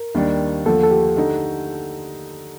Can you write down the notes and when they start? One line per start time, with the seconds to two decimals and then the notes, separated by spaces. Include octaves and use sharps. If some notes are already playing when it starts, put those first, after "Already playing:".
Already playing: A#4
0.15 D#2 D#3 G3 D4
0.65 D#2 D3 F3 A3 A4
0.83 A4
0.91 G4
1.17 D3 A3 D#4